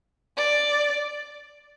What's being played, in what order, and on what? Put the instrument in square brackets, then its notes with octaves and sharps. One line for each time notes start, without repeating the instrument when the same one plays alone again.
[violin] D5